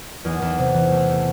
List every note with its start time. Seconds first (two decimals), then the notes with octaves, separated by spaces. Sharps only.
0.25 E2
0.42 E2
0.58 C3
0.74 E3
0.91 A3
1.08 A3